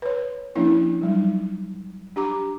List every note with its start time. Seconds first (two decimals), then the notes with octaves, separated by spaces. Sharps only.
0.02 B4 C#5
0.56 F3 A#3 C#4 D4 E4
1.01 F#3 G3 D#4
2.16 D4 G4 A#5 D6